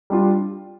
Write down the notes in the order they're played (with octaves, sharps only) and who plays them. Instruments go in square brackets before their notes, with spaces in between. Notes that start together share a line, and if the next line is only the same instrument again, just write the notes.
[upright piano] G3 D4 F4